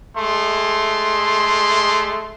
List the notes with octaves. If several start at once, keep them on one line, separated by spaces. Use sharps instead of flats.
G#3 A3 C6